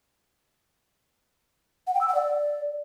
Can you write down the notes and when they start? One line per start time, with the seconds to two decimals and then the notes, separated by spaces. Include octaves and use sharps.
1.87 F#5
1.94 G5
2.01 E6
2.08 F#5
2.15 D5